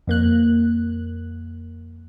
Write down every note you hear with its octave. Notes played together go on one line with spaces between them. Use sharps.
F2 A#3 F#6